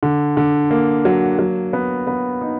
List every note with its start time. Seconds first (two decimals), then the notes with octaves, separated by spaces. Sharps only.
0.03 D3
0.37 D3
0.71 A#3
1.05 F#3
1.39 F#3
1.73 B3
2.07 B3
2.41 D#4